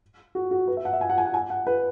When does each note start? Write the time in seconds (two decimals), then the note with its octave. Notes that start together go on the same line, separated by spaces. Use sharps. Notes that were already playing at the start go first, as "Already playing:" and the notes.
0.35 F#4
0.51 F#4
0.67 B4
0.77 E5
0.85 F#5
0.93 E5
1.01 G#5
1.10 F#5
1.18 G#5
1.25 F#5
1.34 G#5
1.50 F#5
1.67 B4